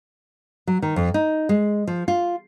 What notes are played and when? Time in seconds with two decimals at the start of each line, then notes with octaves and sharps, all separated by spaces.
0.67 F#3
0.82 D#3
0.96 F2
1.14 D#4
1.49 G#3
1.87 F3
2.08 F4